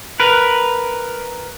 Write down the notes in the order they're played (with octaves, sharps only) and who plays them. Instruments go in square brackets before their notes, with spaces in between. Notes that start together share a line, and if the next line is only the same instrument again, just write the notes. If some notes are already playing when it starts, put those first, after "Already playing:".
[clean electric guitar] A#4 B4